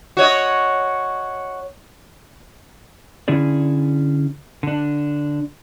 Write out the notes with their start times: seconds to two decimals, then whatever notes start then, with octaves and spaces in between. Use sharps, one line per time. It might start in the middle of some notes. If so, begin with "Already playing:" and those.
0.17 F#4 C#5 D#5
3.28 D3 C#4 E4 G#4 D5
4.63 D3 D4